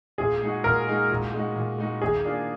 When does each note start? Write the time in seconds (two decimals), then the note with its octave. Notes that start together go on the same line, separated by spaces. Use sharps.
0.18 A#2 G#4
0.41 G#3 D#4 F#4
0.64 A#2 A#4
0.87 G#3 D#4 F#4
1.10 A#2
1.34 G#3 D#4 F#4
1.56 A#2
1.78 G#3 D#4 F#4
2.02 D#3 G#4
2.24 A#3 D4 F4 G#4